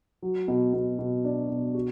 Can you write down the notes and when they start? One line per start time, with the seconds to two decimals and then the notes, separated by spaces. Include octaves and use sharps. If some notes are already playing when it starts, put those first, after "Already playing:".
0.22 F#3
0.48 B2
0.74 B2
0.99 B2
1.25 D4
1.50 B2
1.74 F#4